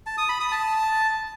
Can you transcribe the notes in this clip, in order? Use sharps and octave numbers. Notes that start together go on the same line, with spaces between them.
A5
D#6
B5
D#6
A5